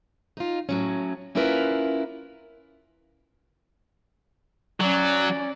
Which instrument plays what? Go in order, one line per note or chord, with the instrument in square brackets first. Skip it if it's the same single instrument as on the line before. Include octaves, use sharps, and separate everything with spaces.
[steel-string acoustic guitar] D#4 F4
A2 F#3 C#4
A#3 C#4 E4 F4 A#4 B4
[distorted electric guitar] F#3 [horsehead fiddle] C#4 D5